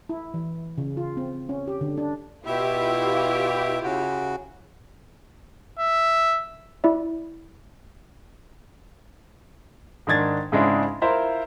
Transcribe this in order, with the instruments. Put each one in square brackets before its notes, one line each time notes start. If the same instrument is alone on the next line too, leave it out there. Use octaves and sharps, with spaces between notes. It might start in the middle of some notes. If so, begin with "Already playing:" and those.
[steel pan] E4
E3
C#3
F4
C4
C#4
G4
D3
D4
[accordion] B2 E5 [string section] E4 F4 G4
[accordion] C#3 F#4
[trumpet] E5
[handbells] E4 D5 E5
[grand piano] G#2 D#3 D4 G#6 A6
G#2 C#3 G#3 C4 D4 E4
E4 F4 A#4 C5 E5 F5